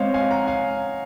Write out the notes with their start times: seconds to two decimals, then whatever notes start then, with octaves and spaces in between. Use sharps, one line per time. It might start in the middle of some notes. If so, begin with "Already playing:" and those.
Already playing: G#3 C4 C5 C#5 D#5 F5
0.14 F5 G#5
0.31 F#5 A#5
0.47 F5 G#5